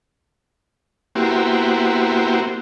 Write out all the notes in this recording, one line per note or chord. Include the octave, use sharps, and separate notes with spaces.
A#3 B3 E4 F#4 G4 C5